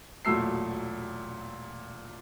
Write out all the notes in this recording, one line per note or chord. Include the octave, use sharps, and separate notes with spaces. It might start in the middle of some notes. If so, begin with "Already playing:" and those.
E1 A#2 F#3 A3 E6 C7